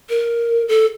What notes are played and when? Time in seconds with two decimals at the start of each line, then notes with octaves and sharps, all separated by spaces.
0.10 A#4
0.68 A4